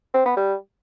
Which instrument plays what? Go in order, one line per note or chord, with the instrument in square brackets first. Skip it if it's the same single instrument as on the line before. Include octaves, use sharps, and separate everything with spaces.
[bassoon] C4
B3
G3